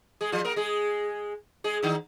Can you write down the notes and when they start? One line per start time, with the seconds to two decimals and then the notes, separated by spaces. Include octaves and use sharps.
0.21 G#3 G#4
0.32 F3 F4
0.44 A#3 A#4
0.56 G#3 G#4
1.64 G#3 G#4
1.83 D#3 D#4